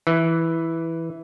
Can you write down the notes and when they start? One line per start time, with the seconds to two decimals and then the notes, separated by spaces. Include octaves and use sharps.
0.07 E3